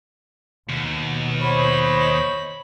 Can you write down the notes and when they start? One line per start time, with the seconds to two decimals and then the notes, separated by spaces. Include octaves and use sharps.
0.69 D#2 B2
1.42 C5 C#5 D#5 B5